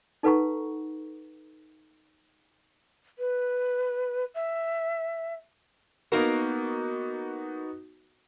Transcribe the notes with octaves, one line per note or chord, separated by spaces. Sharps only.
D#4 A4 B4 F#5 A#5 C#6
B4
E5
A#3 B3 D#4 F#4 A#4